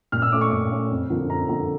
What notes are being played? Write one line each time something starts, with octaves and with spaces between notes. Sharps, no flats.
A#2 F6
E6
A3 C#4 D6
C#6
A#2 D6
A3 C#4
F2
D3 F3 A#3
F2 A#5
D3 F3 A#3 A#5